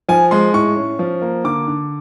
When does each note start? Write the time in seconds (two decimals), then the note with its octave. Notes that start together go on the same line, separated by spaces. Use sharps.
0.08 F3 G#5
0.31 G#3 C6
0.53 A2 C#6
0.76 C#4
0.99 F3
1.22 A#3
1.44 D3 D6
1.67 D3